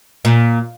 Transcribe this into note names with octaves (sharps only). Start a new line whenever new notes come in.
A#2